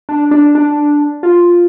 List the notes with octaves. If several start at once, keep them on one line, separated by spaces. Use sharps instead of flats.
D4
D4
D4
F4